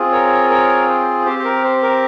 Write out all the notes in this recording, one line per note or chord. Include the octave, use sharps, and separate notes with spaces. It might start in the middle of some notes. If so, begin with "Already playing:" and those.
Already playing: C4 F4 G#4
A#4 C#5
A#4 C#5
C5
C4 G4 C5
C5
A#4
C5
A#4